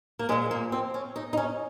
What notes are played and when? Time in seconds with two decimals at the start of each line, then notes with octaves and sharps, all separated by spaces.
0.19 A#3
0.29 A#2 G#3
0.32 F3
0.51 A#3
0.72 C4
0.94 C#4
1.16 D#4
1.33 D#4
1.37 C#4